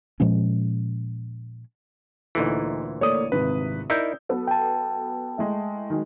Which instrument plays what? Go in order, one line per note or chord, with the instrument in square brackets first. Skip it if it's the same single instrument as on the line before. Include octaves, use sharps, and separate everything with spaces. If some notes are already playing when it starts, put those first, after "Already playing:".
[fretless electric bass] A#2 F3 G#3 C#4
[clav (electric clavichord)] D2 A#2 E3 [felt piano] D#4 A4
[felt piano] A3 A#3 [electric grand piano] C#5 D5 D#6
[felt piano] G#1 C3 [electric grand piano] B4
[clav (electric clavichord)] D#4 E4 A#4 [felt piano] D5 [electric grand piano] E6 G6
[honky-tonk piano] F#3 B3 A4
[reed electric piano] G5 A5
[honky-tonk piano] G#3 A3 E4
D#3 F#3 G#3